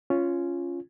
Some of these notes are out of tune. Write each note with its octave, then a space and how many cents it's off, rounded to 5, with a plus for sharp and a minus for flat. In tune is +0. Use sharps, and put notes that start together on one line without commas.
C#4 +0 F4 -10